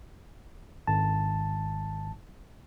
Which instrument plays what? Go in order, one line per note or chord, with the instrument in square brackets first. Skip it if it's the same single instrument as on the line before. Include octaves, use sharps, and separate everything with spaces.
[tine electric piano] G#1 A5